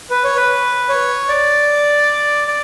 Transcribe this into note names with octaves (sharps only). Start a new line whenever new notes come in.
B4
C#5
B4
C#5
D5
D5